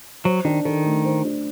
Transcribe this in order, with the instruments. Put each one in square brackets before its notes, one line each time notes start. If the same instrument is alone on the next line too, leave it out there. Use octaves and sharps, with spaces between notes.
[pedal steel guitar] F#3 [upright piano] C5
[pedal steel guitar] D#3 [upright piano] D4
[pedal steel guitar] D#3 [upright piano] A4
[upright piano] A3
C5
D4